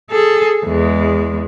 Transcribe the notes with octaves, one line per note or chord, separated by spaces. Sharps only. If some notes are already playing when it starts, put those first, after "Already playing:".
G#4 A4
E2 G#3